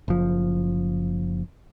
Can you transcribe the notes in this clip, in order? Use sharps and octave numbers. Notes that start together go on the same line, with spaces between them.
F#1 F3